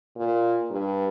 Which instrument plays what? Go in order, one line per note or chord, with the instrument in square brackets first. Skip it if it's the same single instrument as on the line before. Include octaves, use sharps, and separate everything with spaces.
[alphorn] A#2
G2